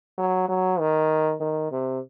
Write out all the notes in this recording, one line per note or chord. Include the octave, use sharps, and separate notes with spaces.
F#3
F#3
D#3
D#3
C3